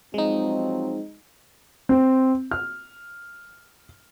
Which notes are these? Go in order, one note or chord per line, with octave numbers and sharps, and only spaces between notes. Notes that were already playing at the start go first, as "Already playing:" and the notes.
F3 F#3 G#3 C4 D#4
C4
F6